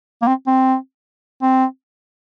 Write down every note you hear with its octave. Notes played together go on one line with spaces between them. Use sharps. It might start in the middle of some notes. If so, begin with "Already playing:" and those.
A#3
C4
C4
C4